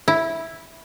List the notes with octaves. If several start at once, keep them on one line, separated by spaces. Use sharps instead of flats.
E4